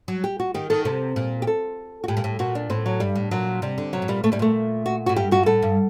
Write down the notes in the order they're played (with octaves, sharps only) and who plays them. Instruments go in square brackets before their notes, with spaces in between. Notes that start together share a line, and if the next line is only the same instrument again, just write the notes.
[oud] F#3
[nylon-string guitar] G4
F#4
[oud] D#3 [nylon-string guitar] G4
[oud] D#3 [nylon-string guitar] A4
[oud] C3 [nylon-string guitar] A4
[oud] A#2
[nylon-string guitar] G4
A4
F#4
[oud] A2 [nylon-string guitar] G4
[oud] A#2
A2
[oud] A#2 [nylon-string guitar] F#4
[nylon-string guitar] D4
[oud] A2 [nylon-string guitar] C4
[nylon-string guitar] F#3
[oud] G2 [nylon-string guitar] G3
[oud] A2
[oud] A#2 [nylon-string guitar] F#3
[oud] C3 [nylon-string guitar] G3
[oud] D3
[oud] C3 [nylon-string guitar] F#3
[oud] A2
[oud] A#2 [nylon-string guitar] G3
[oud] A#2 [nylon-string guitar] A3
[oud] A2 [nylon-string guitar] G3
[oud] A#2 [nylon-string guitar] A3
[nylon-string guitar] F#4
[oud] A2 [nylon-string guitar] F#4
[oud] G2 [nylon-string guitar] G4
[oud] G2 [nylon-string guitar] F#4
[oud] A2 [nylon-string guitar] A4
[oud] G2